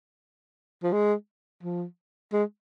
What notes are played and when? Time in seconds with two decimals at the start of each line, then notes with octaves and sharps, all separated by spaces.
0.83 F3
0.92 G#3
1.63 F3
2.33 G#3